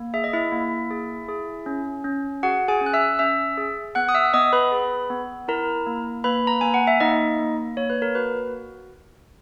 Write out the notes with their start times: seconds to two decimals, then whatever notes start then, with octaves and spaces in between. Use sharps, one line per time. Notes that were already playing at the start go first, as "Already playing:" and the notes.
Already playing: A#3
0.14 G#4 E5
0.24 D#5
0.33 E4 E5
0.52 A#3
0.91 G#4
1.28 G#4
1.66 C#4
2.04 C#4
2.43 F#4 G#4 F#5
2.68 G#4 G#5
2.81 C#4
2.86 F#6
2.94 E5 E6
3.19 C#4 E5 E6
3.57 G#4
3.95 B3 F#5 F#6
4.09 D#6
4.15 E5 E6
4.34 B3 D#5 D#6
4.53 B4 B5
4.72 G#4
5.10 B3
5.48 E4 A#4 A#5
5.86 A#3
6.24 A#3 B4 B5
6.47 A#5
6.61 A#3 G#5
6.74 F#5
6.87 E5
7.00 A#3 D#4 D#5
7.39 A#3
7.77 A#3 C#5
7.90 B4
8.02 A#4
8.15 F#4 B4